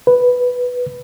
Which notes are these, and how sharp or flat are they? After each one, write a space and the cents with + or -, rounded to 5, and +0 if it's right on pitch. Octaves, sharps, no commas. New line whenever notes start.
B4 +0